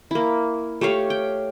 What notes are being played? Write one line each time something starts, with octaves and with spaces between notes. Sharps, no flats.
A#3 E4
A3 G4 C#5 F5
G5